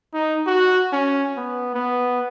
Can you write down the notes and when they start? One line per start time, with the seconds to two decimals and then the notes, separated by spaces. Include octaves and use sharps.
0.14 D#4
0.47 F#4
0.93 C#4
1.37 B3
1.75 B3